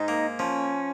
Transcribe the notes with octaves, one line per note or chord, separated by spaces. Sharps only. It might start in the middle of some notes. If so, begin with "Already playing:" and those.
Already playing: G#2 D#4
A#3
F3 C#4